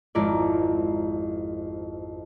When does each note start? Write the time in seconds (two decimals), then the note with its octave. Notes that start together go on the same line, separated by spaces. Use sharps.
0.15 G#1 F2 E4 A#4 D5